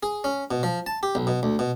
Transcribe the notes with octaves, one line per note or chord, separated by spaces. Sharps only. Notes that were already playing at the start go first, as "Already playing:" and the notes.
G#4
C#4
B2
F3
A5
G4
B1
B2
D2
B2